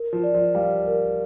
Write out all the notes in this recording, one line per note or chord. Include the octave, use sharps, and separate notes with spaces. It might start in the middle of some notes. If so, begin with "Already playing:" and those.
Already playing: A#4
F3
D5
F3
G3 F5
A#4